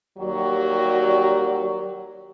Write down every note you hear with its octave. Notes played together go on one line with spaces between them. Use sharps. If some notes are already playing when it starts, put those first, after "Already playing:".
D#2 F#3 G3 F#4 G4 D5